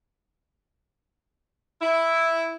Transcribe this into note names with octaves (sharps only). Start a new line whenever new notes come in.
E4